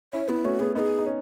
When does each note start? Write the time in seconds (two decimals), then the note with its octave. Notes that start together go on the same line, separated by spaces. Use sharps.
0.13 C#4 E4 C#5
0.29 B3 E4
0.44 A3 C#4 F#4
0.60 B3 G#4
0.75 B3 D#4 A#4
0.79 G#4
0.98 D#4
1.06 C#4